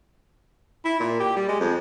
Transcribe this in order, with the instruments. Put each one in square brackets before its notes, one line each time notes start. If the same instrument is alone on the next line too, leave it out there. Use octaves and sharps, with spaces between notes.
[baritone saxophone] E4
A#2
G4
G3
G#3
F2